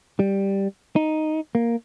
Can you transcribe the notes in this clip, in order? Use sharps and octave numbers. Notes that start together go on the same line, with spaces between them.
G3
D#4
A#3